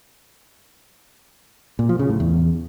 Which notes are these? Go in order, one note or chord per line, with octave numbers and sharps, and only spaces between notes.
A#2
F3
C#3
A2
E2